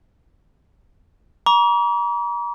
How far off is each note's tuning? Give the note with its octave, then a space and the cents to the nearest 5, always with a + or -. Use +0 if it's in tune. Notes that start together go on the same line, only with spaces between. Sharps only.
A#5 +35 D6 -40